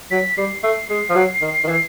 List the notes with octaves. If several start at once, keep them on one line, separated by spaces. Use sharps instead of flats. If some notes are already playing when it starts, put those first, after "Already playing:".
F#3 B6
G3 C7
A3 C7
G#3 C7
F3
F#3
D#3
D#3
E3